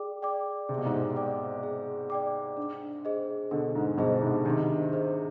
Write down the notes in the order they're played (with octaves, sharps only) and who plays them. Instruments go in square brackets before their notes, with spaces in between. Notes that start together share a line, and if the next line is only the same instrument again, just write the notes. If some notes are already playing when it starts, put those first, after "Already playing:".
Already playing: [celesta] G#4 D5 G5 D6
D5 G5 D6
[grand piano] C3 [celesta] G#4
[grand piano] B2
G#2 C3
[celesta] D5 G5 D6
G#4
D5 G5 D6
D4
G#4 C5 D#5
[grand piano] B2 D3 [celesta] D4
[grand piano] G#2
[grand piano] G2 B2 [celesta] G#4 C5 D#5
[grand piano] G#2 C3
[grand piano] C3 D#3 [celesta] D4
[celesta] G#4 C5 D#5